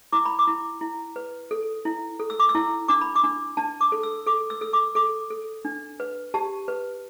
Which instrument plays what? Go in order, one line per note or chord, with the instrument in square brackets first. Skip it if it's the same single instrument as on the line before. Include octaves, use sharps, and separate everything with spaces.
[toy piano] E4 D6
B5
D6
E4
E4
B4
A4
E4
A4
E6
D6
E6
E4
D4 D6
B5
D6
D4
D4 A5
D6
A4
E6
A4 D6
E6
A4 E6
D6
A4 D6
A4
D4
B4
G4 A5
B4